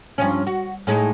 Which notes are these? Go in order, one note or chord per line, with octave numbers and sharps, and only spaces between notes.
G2 F3 C#4
F#4
A2 G#3 D#4